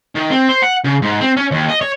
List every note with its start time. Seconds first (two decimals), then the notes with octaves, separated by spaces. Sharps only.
0.15 D#3
0.30 C4
0.49 C5
0.62 F#5
0.84 C#3
1.02 G#2
1.21 C4
1.37 C#4
1.51 D#2
1.69 D#5
1.81 C#5